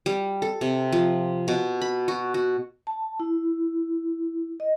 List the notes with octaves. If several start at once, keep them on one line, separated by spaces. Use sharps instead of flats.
G3
A4
C3
F3
B2
B5
F#4
F#4
A5
E4
D#5